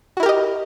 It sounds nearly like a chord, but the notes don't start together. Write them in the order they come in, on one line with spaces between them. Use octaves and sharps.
F#4 E4 A#4 G4 D#5